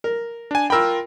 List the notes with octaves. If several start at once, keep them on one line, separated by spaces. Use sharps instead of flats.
A#4
D4 G#5
F4 A#4 G5 B5 E6